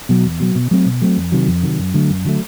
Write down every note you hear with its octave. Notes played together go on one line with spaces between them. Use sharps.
B2 F#3
E2
B2 F#3
B2
F#3 A3 C4
B2
F#3 A3 C4
F2
C3 D#3 F#3
F2
C3 D#3 F#3
F#2
D3 F#3 A3
F#2
D3 F#3 A3